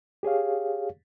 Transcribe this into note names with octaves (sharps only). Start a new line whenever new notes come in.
G4 G#4 C#5 F5